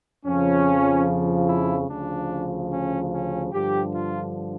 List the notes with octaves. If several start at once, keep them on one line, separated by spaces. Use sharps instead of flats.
F2 C#3 F3 C#4
E4
D2 C#3 F3 D4
C#4
C#4
G2 D3 F3 G4
F4